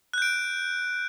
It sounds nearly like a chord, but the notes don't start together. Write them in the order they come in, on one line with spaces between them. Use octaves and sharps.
F#6 G6 D7